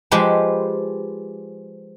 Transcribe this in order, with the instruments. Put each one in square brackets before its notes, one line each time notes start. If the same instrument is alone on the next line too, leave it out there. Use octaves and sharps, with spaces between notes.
[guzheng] F3 G#3 G4 B4 C5